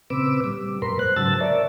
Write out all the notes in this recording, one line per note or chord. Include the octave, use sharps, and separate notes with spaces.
A#2 C#3 C4 B4 D6 E6
G3
F#2 A#2 A#4 B4 C6
C5 F#6
G#2 C#3 F#3 A5 E6 A6
A#4 C#5 D5 E5